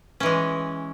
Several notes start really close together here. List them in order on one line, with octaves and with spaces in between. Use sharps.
C#4 E3 G#3